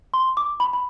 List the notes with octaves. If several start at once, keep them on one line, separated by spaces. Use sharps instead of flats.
C6
D6
B5
B5